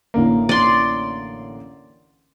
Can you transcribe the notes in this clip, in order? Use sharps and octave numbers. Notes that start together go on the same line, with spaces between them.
A1 D3 A#3
D5 C6